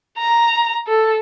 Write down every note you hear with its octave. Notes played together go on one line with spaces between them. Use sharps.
A#5
A4